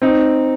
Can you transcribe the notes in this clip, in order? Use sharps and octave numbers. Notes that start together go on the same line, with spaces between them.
C4 D#4